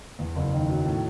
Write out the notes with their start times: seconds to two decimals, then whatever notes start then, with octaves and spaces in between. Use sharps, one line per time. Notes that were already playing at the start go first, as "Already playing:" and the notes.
0.19 E2
0.35 F#1
0.53 D#3
0.69 F#3
0.85 A2